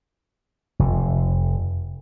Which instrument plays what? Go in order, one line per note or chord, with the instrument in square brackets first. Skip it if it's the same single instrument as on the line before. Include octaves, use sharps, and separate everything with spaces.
[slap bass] F1